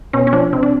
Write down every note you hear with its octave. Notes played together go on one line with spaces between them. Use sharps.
B2 C#4
C#4
F3 D4
C3
D4